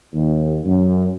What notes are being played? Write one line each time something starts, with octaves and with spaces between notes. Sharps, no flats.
D#2
F#2